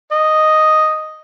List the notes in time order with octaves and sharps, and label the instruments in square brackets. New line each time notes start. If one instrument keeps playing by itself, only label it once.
[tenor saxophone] D#5